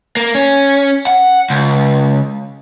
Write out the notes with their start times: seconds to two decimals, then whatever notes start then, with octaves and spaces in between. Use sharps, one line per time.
0.17 A#3
0.35 C#4
1.07 F#5
1.50 C#2